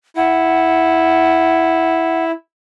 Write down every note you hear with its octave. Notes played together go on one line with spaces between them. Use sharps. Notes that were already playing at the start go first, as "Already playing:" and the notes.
E4 F#5